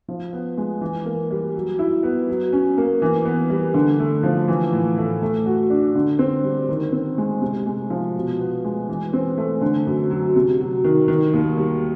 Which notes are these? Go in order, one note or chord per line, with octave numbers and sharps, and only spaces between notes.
F3
B3
G#3
E3
A#3
G3
F#3
E4
B3
F#3
C#4
A#3
E3
B3
G3
D3
A3
F3
E3
A2
A3
A3
F#4
D4
D3
C4
G3
D#3
C4
G#3
C3
G#3
F3
B2
B3
G#3
E3
C4
A3
D3
F#2
F#3
C3
F#3
D#3
D#3
D#2
G3